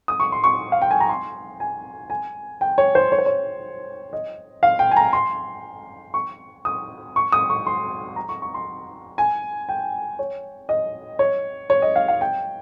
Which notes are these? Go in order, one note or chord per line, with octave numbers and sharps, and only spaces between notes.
D#6
C#6
C6
C#6
F5
G5
G#5
A#5
C6
G#5
G#5
G5
C#5
C5
C#5
C5
C#5
D#5
F5
G5
G#5
A#5
C6
C#6
D#6
C#6
D#6
C#6
C6
A#5
C#6
C#6
C6
G#5
G5
C#5
D#5
C#5
C#5
D#5
F5
F5
G5